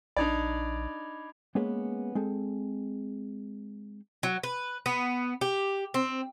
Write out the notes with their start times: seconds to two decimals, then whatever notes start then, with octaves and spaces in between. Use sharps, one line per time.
0.17 A#1 D4 D#4 D5 B5 G#6 F7
1.55 G#3 A#3 B3 C#4 G#4 B4
2.15 G#3 C4 G#4 A4
4.23 F#3
4.43 B4
4.86 B3
5.41 G4
5.94 C4